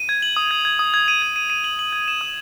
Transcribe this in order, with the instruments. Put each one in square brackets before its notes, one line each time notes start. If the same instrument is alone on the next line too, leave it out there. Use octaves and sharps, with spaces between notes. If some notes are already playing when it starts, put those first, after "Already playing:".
Already playing: [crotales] D#7
G#6
F#7
D#6
G#6
G#6
D#6
G#6
D#7
G#6
D#7
D#7
F#7
F#7
G#6
E7
D#6